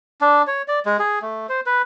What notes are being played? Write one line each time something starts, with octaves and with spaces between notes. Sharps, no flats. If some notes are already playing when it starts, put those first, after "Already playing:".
D4
C#5
D5
G#3
G#4
A3
C5
B4